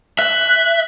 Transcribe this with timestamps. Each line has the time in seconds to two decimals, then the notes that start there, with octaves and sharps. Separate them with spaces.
0.19 E5 F#6